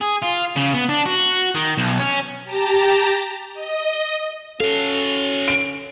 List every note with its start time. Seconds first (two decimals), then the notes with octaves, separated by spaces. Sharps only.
0.01 G#4
0.22 F4
0.56 C#3
0.74 B3
0.89 D4
1.06 F#4
1.55 D#3
1.77 B1
1.99 C#4
2.44 G4 A5 A#5
3.54 D#5
4.60 C#4 F#4 A4 F5
5.48 D7